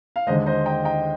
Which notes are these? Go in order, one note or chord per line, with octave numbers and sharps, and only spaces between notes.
F5
D#2 D3 G#3 C5 D#5
C5 D#5
D#5 G5
D#5 G5